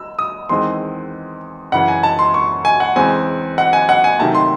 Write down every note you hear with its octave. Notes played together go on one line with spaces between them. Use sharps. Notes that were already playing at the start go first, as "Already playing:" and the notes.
Already playing: E6
D#6
E2 D#3 G#3 C4 C6
F#2 C#3 E3 F#5
G#5
A5
C6
C#6
G#5
F#5
E2 C#3 G#3 C4 G#5
F#5
G#5
F#5
G#5
C3 D#3 F#3 A3 A5
C6